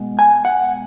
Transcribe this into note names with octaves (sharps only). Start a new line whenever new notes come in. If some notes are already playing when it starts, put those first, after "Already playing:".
Already playing: B2 G#3 B3
G#5
F#5